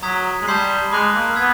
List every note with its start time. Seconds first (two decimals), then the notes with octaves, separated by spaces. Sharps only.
0.02 F#3 A#5 D#6 G#6 B6
0.42 G#3
0.47 G3 A5 C6 D#6 G6 C7
0.92 G#3 B5 D6 F#6
1.14 A#3
1.36 B3 E6 G#6 B6